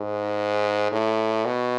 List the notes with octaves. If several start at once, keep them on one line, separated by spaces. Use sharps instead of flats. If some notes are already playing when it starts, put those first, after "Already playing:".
Already playing: G#2
A2
B2